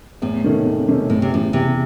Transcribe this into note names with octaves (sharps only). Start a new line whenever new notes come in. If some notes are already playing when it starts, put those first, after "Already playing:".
E2 A2
C3 D#3 A3 C#4
E2
C3 D#3 A3 C#4
E2 A2
C3
A2 C#3 E3
E2 C3